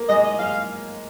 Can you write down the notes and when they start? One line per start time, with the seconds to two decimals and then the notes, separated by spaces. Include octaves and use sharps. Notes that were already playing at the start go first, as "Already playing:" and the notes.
Already playing: A#3
0.08 G#3 D#5
0.24 D#5
0.39 G#3 F5